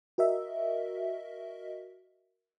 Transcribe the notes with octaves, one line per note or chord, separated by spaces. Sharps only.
F#4 A#4 D#5 E5